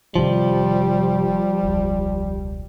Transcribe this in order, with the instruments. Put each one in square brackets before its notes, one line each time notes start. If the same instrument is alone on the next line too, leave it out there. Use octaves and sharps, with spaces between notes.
[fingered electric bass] F#1 C3 D#3 [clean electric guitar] F3 [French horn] G3
[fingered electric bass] E1 C#2